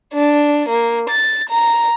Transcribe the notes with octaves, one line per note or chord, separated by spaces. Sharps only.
D4
A#3
A6
A#5